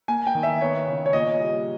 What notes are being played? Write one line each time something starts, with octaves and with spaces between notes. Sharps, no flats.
A#3 G#5
G5
D#3
E5
B3 C#5
C#3
C#5
A#2 D#5
G3